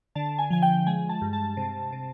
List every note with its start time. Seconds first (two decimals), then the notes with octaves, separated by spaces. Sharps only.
0.15 D3 A5
0.39 G#5
0.50 F3 G#5
0.62 G5
0.87 G#3 G#5
1.09 A5
1.21 G2
1.33 A5
1.57 C3
1.92 C3